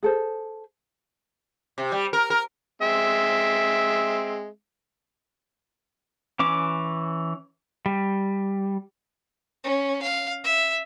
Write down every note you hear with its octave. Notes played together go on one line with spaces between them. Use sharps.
G#4 A4 C5
C3
G3
A#4
A#4
G#3 C4 E5
E3 C#4 D6
G3
C#4
F5
E5